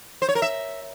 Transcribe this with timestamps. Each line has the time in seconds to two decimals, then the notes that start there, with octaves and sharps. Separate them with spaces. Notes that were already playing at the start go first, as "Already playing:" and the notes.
0.22 C5
0.29 C#5
0.35 A#4
0.42 E5